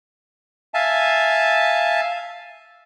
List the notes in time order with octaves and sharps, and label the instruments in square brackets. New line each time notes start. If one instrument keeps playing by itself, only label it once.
[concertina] E5 F5 G#5 A5